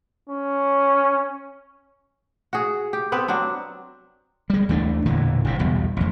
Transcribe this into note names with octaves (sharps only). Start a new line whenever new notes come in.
C#4
F#4 G#4
G4
B3 C4 B4
F#3 C4 D4
G3 G#3
D#2 E3 A3 D4
E1 A#2 D3 E3
F#1 F2 G#2 C3
B1 E2 B2 G3
A1 F2